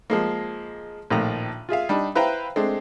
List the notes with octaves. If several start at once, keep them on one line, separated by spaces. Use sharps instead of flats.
F3 G#3 A#3
A#1 A2 D#3 F3 A#5
F4 G#4 E5 F5
G3 D4 D#4
E4 B4 C5 F5 G5 A#5
G#3 A3 C4 D4